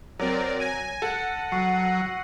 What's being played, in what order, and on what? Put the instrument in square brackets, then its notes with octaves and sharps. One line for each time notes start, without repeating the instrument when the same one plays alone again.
[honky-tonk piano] F#3 [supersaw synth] C4 A#4 D5
[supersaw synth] G#5 [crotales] A#6 D#7
[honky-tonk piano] A4 [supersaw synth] F#5
[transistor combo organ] F#3 [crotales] C#6 C7
[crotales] E6 A#6